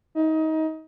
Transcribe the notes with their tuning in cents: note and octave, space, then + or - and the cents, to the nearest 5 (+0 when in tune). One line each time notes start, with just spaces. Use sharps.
D#4 +25